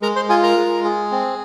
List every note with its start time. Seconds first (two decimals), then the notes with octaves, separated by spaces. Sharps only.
0.02 G#3 A#4 A#5
0.16 C5 C6
0.29 F4 G#4 G#5
0.43 A#4 A#5
0.57 G#3
0.84 G#4
1.12 C4